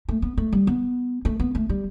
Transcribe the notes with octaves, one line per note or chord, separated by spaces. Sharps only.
A3
B3
A3
G3
B3
A3
B3
A3
G3